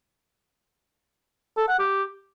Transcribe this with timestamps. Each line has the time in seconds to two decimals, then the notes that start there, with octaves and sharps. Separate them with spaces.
1.57 A4
1.68 F#5
1.79 G4